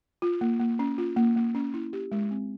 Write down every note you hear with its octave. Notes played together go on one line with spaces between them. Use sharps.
F4
A#3
A#3
C#4
F4
A#3
A#3
C#4
E4
G4
G#3
C4